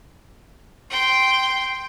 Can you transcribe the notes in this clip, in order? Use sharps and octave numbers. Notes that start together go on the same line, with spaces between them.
G5 C6